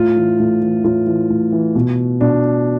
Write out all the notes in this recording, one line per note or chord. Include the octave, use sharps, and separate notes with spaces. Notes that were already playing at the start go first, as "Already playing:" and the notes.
Already playing: A2 F4
E3
A2
E3
A2 F4
E3
A2
E3
B2
B2 D4